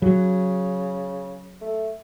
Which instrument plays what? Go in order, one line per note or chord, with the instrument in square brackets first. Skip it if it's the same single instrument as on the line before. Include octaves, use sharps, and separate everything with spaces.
[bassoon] C#3 [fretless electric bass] F#3
[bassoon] A3